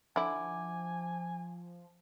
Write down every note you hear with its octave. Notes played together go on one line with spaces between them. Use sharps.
D3 F3 E4 G#5 D6